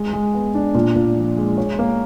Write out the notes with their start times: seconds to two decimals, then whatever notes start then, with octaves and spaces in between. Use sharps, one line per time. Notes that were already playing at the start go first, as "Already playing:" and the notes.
Already playing: G#3
0.13 G#3
0.34 B3
0.54 D4
0.75 A#2
0.95 A#2
1.17 F3
1.37 G#3
1.58 C#5
1.79 A#3